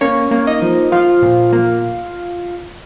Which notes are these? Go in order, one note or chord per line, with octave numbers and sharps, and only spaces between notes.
A#3 C#4 C#5
A#3
D#4 D#5
F3
F3 F4 F5
A#2
A#3